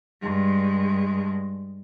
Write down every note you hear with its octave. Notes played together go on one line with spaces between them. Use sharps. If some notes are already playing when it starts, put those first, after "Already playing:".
G2 G#3